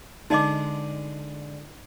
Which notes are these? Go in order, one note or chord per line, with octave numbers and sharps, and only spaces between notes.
D3 G#3 D#4 D#5 D6